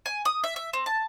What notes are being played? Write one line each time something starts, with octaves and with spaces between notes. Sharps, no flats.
G#5
D#6
E5
E5
C4
A5